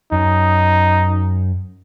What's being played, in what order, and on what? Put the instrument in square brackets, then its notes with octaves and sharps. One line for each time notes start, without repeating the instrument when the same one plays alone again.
[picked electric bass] F#2 [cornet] D#4